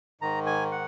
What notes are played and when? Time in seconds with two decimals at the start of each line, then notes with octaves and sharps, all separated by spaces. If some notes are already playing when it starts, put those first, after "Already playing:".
0.21 G#2 D#3 A#5
0.46 G#5
0.72 F#5